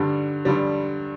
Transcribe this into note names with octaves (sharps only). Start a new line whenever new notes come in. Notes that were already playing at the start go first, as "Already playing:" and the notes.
Already playing: G2 D3 G3
G2 D3 G3